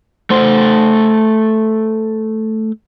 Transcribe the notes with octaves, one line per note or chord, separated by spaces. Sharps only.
A3 C5